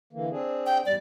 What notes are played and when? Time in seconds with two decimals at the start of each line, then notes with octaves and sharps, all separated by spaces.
0.13 D3 E3 A#3
0.31 C4 D4 G#4
0.66 G5
0.86 E2 G#2 G3 D5